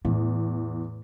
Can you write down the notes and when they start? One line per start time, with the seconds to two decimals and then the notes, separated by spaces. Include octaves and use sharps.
0.05 E2 A2